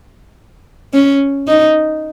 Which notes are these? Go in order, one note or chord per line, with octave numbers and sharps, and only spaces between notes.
C#4
D#4